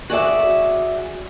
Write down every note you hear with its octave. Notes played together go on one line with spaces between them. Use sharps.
F#4 G#4 D5 E5